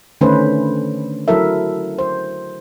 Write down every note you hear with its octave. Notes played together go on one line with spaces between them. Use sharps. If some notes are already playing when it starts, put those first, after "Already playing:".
D3 D#3 A3 C#4 B4 C5
F#3 E4 A4 A#4 E5
C5